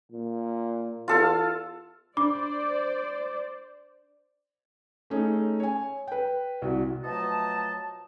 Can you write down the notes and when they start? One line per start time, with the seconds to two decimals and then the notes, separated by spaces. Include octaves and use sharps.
0.12 A#2
1.08 E2 F4 A4 F5
2.17 D4 C5 D5 D6
5.10 A3 C#4 D#4 G#4
5.60 C#5 G#5
6.08 B4 G5
6.62 C2 F#4
7.04 B2 F3 F#3 A3 D#5 A5